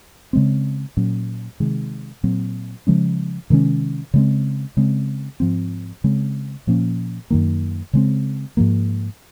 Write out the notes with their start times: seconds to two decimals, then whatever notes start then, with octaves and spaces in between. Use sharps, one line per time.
0.33 C#3 G#3 C4
0.97 A#2 F#3 C#4
1.60 C3 D#3 G#3
2.23 A#2 F#3 C4
2.87 C#3 F3 G#3 C#4
3.50 C3 D#3 G#3 C#4
4.14 C#3 G#3 C4
4.77 C#3 G#3 C4
5.40 G#2 F3 C4
6.04 C#3 G#3 C4
6.67 A#2 F3 A#3 C#4
7.30 F#2 D#3 A#3
7.93 C#3 G#3 C4
8.57 G#2 F3 A#3